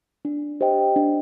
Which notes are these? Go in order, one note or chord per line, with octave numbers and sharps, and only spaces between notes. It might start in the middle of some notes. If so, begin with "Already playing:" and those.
D4
G4 C5 D#5 G5
D4